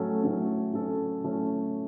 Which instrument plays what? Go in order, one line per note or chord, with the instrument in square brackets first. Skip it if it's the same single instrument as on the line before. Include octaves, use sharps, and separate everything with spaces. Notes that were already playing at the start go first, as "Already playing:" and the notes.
Already playing: [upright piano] A2 F#3 A3 C#4 A4
A2 F#3 A3 C#4 A4
A2 F#3 A3 C#4 A4
A2 F#3 A3 C#4 A4